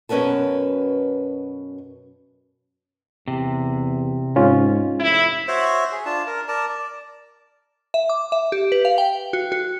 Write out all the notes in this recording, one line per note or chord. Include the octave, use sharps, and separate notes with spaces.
F#2 B2 C#4 A#4 B4 A5
E2 C3
G#2 C#4 F4
F1 E4
F#4 C5 C#5 E5
G#4
D4 F4 A5
A#4
A#4 D5 A5
D5
E5
D6
E5
G4
B4
F5
G5
F#4
F#4